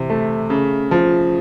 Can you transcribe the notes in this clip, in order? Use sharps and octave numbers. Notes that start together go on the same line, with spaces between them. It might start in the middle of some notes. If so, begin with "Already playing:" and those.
Already playing: C3 E3
A3
C#3
F3